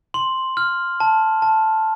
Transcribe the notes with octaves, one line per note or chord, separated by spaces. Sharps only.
C6 F#7
F6
A5
A5